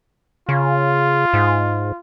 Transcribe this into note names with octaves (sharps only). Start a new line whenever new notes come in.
C#3 F4
G#2